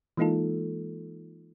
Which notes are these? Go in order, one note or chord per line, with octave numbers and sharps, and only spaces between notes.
E3 G#3 A#3 D#4 F4 A4